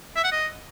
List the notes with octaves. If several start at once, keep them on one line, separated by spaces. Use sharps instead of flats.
E5
F#5
D#5